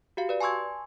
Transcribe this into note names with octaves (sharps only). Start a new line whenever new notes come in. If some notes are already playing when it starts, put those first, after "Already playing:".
F#4 G4 F5
B4 D5
G#5 A5 C6 C#6 E6 G#6